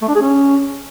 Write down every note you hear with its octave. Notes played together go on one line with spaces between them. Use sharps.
A3
D4
G#4
C#4